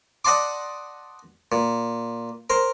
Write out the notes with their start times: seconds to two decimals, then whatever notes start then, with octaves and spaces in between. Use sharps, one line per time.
0.25 D5 D#5 F#5 A5 C6 D6
1.52 A#2
2.50 A#4 C5